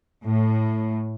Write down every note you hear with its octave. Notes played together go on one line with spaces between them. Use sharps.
A2